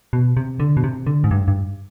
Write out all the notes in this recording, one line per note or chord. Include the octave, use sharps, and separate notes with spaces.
B2
C3
D3
B2
C3
D3
G#2
G2
G2